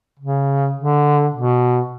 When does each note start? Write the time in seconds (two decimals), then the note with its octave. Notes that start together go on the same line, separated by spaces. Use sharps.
0.19 C#3
0.77 D3
1.34 B2